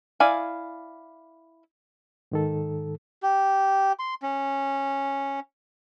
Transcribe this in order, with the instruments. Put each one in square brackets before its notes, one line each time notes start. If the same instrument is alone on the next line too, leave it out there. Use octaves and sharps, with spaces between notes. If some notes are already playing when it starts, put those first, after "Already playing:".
[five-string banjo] E4 D5 F5 G#5
[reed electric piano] G#2 D#3 A4
[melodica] G4
C6
C#4